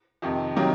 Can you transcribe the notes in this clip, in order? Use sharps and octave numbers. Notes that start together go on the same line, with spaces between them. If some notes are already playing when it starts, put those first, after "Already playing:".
F2 C3 D#3
C3 D#3 F#3 A#3 D#4